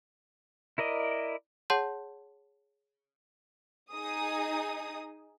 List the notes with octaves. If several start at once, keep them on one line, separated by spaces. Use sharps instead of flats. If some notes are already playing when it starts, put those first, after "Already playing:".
E4 A#4 D5 D#5
G#4 C#5 F#5 A5 C6 G6
D#4 G#4 D#6